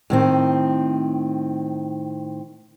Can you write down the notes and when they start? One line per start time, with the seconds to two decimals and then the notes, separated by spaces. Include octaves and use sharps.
0.10 A2 D#3 C4